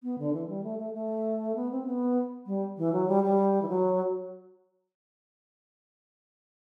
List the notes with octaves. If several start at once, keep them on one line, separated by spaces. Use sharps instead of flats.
B3
D3
E3
G3
A3
A3
A3
B3
C4
B3
G3
E3
F#3
G3
G3
E3
F#3